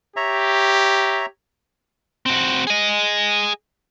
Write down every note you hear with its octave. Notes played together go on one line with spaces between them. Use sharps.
G4 C#5 E5 A#5
C4 F#4
G#4 D#5